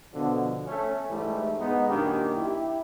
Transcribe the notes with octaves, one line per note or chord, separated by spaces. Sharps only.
B2 D3 F3
A3 C#4
G#2 E3 G3 A3
G#2 B3 D#4
F#2 A#2 D#3 A#3 D4 G4
E4 G4